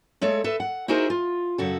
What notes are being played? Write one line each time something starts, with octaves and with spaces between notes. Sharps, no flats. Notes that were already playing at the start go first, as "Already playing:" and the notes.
G#3 A3 A4 C#5
A4 B4 E5
F#5
D#4 E4 F#4 G#4 A#4 C5
F4
F#2 C#3 F#4 A4